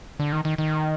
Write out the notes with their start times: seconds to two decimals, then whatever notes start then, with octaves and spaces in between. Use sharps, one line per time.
0.19 D3
0.32 D#3
0.45 D#3
0.58 D#3